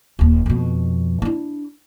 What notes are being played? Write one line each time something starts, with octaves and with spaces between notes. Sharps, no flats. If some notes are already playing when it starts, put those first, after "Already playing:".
D#1 D#2
F2 B2
D4 E4